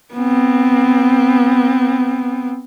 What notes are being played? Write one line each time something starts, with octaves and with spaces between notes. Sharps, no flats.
B3 C4